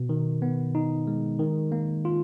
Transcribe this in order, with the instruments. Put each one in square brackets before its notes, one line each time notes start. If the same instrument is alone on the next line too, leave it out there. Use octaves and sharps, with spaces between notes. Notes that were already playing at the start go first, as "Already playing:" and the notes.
Already playing: [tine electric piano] B2
D#3
B3
D#4
G#3
D#3
A#3
F4